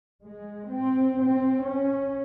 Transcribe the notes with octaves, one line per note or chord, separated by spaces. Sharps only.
G#3
C4
C4
C#4